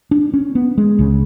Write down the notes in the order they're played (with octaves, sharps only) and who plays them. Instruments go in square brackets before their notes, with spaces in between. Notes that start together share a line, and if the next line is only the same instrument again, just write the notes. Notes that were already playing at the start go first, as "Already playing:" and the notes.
[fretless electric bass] D4
C#4
B3
G#3
C#2 C#3